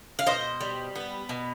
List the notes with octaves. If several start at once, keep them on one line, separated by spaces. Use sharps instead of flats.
F5
B2 C5 D#5
G3
B3
B2